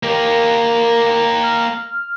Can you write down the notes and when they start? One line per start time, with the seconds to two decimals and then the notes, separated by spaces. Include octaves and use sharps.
0.03 A#3 G4 A#4
1.43 F6